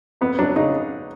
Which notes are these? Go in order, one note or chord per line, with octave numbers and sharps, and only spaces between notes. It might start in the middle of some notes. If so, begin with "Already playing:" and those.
F2 B3
F#3 D4
C#3 D#4